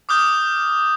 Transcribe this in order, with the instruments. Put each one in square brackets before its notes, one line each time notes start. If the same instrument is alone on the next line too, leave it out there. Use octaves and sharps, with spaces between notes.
[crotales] D6 D#6 F6 G6